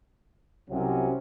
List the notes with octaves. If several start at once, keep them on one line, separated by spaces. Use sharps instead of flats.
C2 C3 F#3 C#4